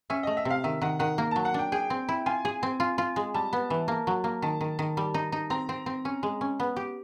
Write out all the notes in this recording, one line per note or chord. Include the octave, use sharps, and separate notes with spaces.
C#4 E5
A3 D#5
E5
C3
F5
D#3 E5
D#3 F#5
D#3 F#5
A#3
F#3 A5
F#5
D4 G5
G#4 G5
C4
E4
F4 G#5
G#4
C4
F4
F4
G#3
G3 A5
B3
E3
A#3
F#3
A#3
D#3 A5
D#3
D#3
G3
D#4
D#4
C4 A#5
C4
C4
C#4
G#3
C#4
B3
G4